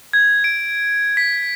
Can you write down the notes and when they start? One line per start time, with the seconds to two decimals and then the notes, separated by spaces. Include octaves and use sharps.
0.13 G#6
0.44 D7
1.17 B6